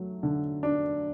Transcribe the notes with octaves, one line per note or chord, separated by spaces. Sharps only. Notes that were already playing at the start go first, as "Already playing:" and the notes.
Already playing: F#3 A3
D3
D4